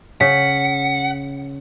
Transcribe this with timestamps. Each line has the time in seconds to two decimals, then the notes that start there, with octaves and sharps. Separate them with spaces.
0.21 C#3 F#5 B6